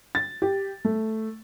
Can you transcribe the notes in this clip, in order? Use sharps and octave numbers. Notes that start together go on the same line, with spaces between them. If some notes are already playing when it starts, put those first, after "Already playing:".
A6
G4
A3